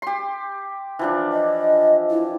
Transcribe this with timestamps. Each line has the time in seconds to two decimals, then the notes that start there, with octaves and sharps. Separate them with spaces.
0.02 G4 C6
0.99 E3 F3 D4
1.32 D#5
2.10 E4